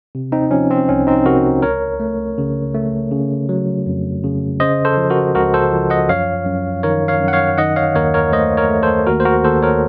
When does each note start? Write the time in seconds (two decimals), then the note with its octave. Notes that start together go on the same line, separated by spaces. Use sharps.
0.15 C3
0.32 C4 D#4
0.51 F3 C#4
0.71 C4
0.89 C2 C#4
1.07 C4 D#4
1.25 C3 F#4 A#4
1.62 C#2 A#4 C#5
2.00 A3
2.38 C#3
2.74 A3
3.11 C#3
3.49 F#3
3.86 F2
4.24 C#3
4.60 C#3 C5 D#5
4.85 A4 C5
4.97 F3
5.10 F#4 A#4
5.35 C#2 F#4 A#4
5.54 A4 C5
5.72 F3
5.90 D#5 F#5
6.09 F#2 C#5 F5
6.46 F#2
6.83 D#3 A#4 C#5
7.08 C#5 F5
7.20 F#2
7.28 F#5
7.33 C#5 F5
7.58 D#3 D#5 F#5
7.76 C#5 F5
7.95 D#2 A#4 C#5
8.14 A#4 C#5
8.32 A3 C5 D#5
8.57 A#4 C#5
8.69 A3
8.83 A4 C5
9.07 D#2 F#4 A#4
9.20 C5
9.25 F#4 A#4
9.44 D#2 A4 C5
9.63 A#4 C#5